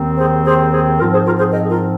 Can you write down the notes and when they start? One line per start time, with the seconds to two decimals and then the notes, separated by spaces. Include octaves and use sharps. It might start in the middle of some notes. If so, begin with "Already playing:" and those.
Already playing: D#2 D#3 C4
0.18 G#4 C5
0.45 G#4 C5
0.72 G#4 C5
0.99 G#2 F3 C4 F4 A#4
1.12 G#4 C5
1.26 F4 A#4
1.39 G#4 C5
1.52 A#4 D#5
1.65 G#4
1.70 F4 A#4